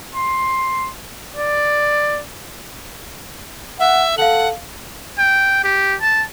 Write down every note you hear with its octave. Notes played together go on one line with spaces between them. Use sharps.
C6
D5
E5 F#5
A4 F5 F#5 F#7
G5
G4
A5